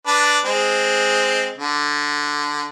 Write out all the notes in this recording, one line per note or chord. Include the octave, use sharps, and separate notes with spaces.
D4 B4 D5
G#3 C4
D3